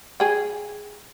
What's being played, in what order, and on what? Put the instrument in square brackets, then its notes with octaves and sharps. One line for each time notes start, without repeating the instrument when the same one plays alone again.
[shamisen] G#4 G5